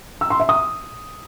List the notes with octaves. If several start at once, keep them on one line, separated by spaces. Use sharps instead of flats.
E6
C6
E5
D#6